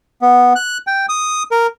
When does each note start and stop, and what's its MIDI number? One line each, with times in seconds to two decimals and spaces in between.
0.22 0.53 59
0.56 0.78 90
0.87 1.06 79
1.09 1.43 87
1.51 1.67 70